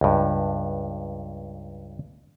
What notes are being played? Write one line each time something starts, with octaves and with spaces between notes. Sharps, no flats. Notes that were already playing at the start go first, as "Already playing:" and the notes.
C#2 G2